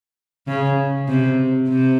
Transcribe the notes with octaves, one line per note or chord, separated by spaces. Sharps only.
C#3
C3
C3